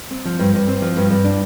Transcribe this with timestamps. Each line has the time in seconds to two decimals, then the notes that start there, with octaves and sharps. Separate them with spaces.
0.11 C4
0.25 F3
0.39 G2
0.54 G2
0.68 C4
0.82 F3
0.97 G2
1.10 G2
1.24 D4